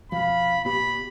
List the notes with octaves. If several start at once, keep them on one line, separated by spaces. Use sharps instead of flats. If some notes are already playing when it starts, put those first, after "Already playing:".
F2 B2 F3 F5 B5
A#2 B3 G4 B5